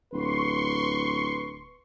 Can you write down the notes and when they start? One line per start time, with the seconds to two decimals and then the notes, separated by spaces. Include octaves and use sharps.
0.13 D1 B4 C6 C#6